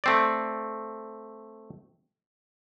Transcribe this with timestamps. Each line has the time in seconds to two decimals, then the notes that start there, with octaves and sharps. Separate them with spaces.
0.04 A3 C4 D5